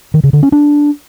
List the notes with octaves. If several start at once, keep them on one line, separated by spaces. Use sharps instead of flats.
D#3
C#3
D3
C#4
D4